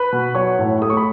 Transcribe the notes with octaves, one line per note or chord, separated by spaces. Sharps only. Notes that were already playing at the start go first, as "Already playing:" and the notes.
Already playing: B4 B5
B2
F#3 C#5 C#6
A2
A3 D#6
C#6
B5